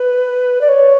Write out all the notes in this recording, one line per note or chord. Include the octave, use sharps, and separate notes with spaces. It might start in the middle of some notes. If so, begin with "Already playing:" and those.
Already playing: B4
D5
C#5